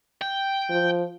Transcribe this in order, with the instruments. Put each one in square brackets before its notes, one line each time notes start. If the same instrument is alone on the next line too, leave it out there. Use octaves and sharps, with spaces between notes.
[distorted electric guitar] G5
[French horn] F3